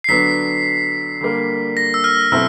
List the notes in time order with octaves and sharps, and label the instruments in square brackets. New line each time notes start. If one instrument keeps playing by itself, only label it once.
[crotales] C7
[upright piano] D3 F#3 B3 D4 [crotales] B6
[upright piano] D3 G3 A#3
[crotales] A#6
E6
F6
[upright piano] B2 F#3 A3 C4 E4 [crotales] E6